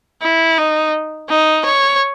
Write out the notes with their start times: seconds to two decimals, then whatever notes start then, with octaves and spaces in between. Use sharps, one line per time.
0.22 E4
0.57 D#4
1.29 D#4
1.65 C#5